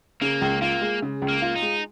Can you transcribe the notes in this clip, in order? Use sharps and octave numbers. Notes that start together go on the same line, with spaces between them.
C#3 A#3
C#2
A#3 F4
G#3
C#3
C#2
A#3
F4
D#4
G#3